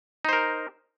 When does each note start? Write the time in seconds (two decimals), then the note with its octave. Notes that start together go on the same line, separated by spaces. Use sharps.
0.25 D#4
0.29 C5
0.33 A#4